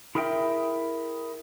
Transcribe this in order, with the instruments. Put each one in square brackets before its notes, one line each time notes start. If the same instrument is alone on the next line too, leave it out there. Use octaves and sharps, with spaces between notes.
[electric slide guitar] E4 G#4 A#4 E5 G5